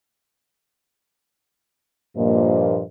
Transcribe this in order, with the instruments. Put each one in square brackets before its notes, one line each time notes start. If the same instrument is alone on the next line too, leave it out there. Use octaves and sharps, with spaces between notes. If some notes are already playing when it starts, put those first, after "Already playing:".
[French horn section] G2 A#2 F3 A#3 C5 D#5